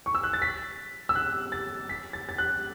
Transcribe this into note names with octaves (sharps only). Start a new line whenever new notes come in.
C#6
E6
F#6
A6
B6
E6
F#6
A6
B6
A6
A6
F#6